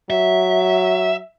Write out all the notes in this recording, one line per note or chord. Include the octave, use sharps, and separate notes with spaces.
F#3 E5